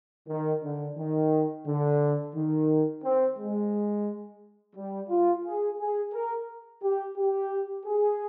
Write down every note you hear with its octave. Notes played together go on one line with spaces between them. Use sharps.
D#3
D3
D#3
D3
D#3
C4
G#3
G3
F4
G#4
G#4
A#4
G4
G4
G#4